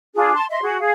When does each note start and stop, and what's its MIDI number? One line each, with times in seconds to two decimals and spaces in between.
0.15 0.35 62
0.15 0.35 65
0.15 0.35 68
0.36 0.45 81
0.36 0.45 84
0.50 0.62 75
0.50 0.62 76
0.50 0.62 84
0.62 0.78 66
0.62 0.78 68
0.80 0.93 68
0.80 0.93 77